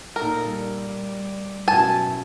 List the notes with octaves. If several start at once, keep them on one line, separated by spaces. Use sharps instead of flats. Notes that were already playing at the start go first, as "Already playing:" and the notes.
A#2 D#4 A4 A#4
G3
F#2 B2 E4 G#5 A5